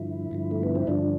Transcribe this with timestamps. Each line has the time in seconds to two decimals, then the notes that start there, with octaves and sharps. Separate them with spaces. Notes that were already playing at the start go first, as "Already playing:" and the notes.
Already playing: G2 D3 F3 E4
0.31 G2 D3 F3
0.51 A3
0.63 B3
0.75 C4
0.87 G2 D3 F3 D4